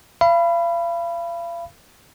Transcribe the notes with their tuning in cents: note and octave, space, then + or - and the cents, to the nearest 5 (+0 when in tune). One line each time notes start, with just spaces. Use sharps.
F5 -40 B5 +0